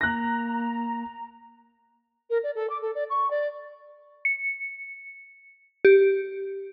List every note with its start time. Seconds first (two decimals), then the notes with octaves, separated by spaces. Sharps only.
0.01 A#3 A#5 F#6 A#6
2.30 A#4
2.43 D5
2.55 A4
2.69 D6
2.82 A4
2.95 D5
3.10 C#6
3.30 D5
4.25 C#7
5.85 G4